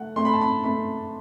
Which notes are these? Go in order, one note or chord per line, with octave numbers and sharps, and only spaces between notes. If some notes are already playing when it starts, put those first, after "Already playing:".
Already playing: A3 F#5
A3 C6
B5
A5
B5
A3 B5